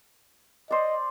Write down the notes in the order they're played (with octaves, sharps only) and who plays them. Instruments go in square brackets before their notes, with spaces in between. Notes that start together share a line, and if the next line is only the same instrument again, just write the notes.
[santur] C5 D5 [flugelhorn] D#5